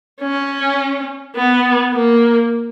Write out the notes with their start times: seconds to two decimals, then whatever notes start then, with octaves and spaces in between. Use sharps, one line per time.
0.21 C#4
1.36 B3
1.93 A#3